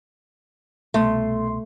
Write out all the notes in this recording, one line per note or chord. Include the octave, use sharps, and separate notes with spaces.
C2 B2 A3 C6